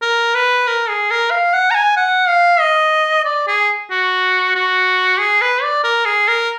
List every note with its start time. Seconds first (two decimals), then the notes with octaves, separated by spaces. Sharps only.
0.02 A#4
0.35 B4
0.67 A#4
0.89 G#4
1.10 A#4
1.31 F5
1.54 F#5
1.71 A#5
1.75 G#5
1.97 F#5
2.28 F5
2.60 D#5
3.25 D5
3.48 G#4
3.91 F#4
4.55 F#4
5.20 G#4
5.42 B4
5.63 D5
5.84 A#4
6.05 G#4
6.28 A#4